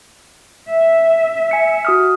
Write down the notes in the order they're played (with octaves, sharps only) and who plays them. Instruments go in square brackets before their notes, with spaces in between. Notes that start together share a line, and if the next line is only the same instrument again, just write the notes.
[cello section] E5
[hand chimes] G#5 C#7
F#4 D#6 F6